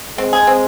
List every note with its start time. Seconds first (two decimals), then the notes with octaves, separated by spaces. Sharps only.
0.18 G#3 C4
0.33 G#4
0.47 C4